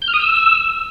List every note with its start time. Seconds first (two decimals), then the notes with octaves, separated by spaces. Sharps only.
0.02 G6
0.08 F6
0.14 D#6
0.20 E6